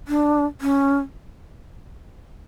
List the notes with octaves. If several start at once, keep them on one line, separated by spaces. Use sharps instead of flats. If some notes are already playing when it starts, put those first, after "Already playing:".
D4
C#4